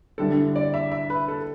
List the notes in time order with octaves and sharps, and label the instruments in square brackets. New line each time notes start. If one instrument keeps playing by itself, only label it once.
[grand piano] D3 G3 E4 [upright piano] A4
[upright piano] D5
E5
E5
B4
A4